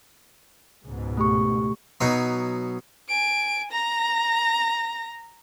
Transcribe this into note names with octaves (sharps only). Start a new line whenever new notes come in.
C#2 G#2 B2
A3 G4 C#6
B2 F#3 D#4
G#5 D7
A#5 A#6